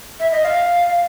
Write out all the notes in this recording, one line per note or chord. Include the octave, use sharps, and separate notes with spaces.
E5
D#5
F5